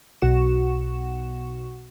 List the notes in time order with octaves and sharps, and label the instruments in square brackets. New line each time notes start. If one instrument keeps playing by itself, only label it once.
[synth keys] B1 B2 F#4 C#6 E7